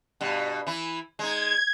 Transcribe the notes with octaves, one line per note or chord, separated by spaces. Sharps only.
G2 B2
E3 E4
G#3 D#4 G#6